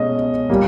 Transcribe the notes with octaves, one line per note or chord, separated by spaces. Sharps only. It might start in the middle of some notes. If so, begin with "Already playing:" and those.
Already playing: B2 G#3 C#4 D#5
A#2 G3 A#3